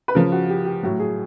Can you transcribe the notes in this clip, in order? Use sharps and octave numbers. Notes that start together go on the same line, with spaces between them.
B4
C#3 F3 A#4
F#4
G4
G4
A2 F#3
G#4